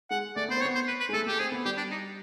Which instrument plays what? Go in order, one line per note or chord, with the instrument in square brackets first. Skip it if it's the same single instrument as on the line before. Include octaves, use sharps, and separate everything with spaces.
[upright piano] G#3 [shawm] F#5
[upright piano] A3 [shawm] D5
[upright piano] B3 [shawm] C5
[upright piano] C4
[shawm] C#5
[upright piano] B3
[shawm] C5
B4
B4
[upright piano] G#3
[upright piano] A3 [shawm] A4
[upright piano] A3 [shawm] G4
[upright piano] C4 [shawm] G#4
[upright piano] B3
[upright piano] G3 [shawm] G4
[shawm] D4
D#4